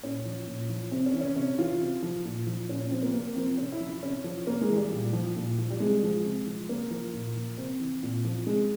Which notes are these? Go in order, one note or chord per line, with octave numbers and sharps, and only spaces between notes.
A#2 C#4
F3
A#2
F3
C3 C4
C#4
E3
C#4
C3 C#4
E3 F4
C3
F3
A#2
F3
A#2 C#4
C#4
F3 C4
A#3
C3 A#3
F3 C4
C3 C#4
E4
F3
E4
C3 C#4
F3
C3 A#3
G#3
E3
G3
A#2
F3
A#2
F3
G3
C3 G#3
F3
C3
F3
C3 A#3
F3
A#2
F3
C3 C4
E3
A#2
F3
C3 G#3